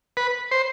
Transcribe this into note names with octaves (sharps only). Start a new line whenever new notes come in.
B4
C5